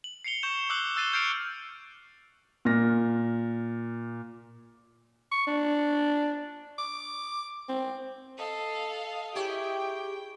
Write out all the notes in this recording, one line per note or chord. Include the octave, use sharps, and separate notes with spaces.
F#7
C7 C#7 F7 G7
C#6 G6 E7
D6 E6 F#6 C#7 F#7 G7
E6 F#6 A6 C7 D#7 G7
F6 G6 A6 C7 D7 F7
A#2 F6 A#6
C#6
D4
D6
C4
A4 D#5 F5
E4 G4 G#4 C#5 G5